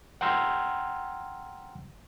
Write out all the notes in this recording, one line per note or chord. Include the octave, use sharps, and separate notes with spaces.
F#5 G5 A#5 C6 E6 F6